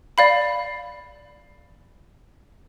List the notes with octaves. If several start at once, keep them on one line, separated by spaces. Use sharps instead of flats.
D5 F5 B5